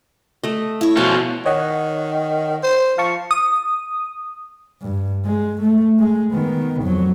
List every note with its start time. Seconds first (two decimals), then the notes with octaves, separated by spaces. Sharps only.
0.44 A3 D#5
0.81 E4 C#5
0.97 B2 F3 C#4 A5
1.46 D#3 C#5 D#5 F#5
2.63 C5
2.98 F3 F5 A5 C#6
3.31 D#6
4.82 G2
5.25 G#3
5.62 A3
5.99 G#3
6.33 D#3 B3
6.83 F2 F#3